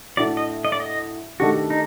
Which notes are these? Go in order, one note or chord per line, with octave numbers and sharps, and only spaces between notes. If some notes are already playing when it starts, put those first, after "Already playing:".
A2 A3 D4 F#4 D5
D#5
D#5
D5
D#5
D#3 A3 D4 F#4 G4
D#4